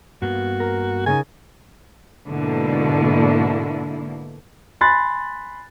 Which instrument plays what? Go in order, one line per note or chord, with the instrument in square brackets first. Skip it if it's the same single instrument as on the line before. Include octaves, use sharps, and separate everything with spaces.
[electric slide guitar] G2 A#3 B3 [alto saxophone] F#4
[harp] A#4
[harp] C#3 C#4 D#4 [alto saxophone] G#5
[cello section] G#2 B2 D3 A#3 E4
[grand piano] G#5 B5 C6 F#6 A6